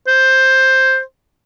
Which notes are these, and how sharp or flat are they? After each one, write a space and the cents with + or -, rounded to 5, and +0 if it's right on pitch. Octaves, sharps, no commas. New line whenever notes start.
C5 +5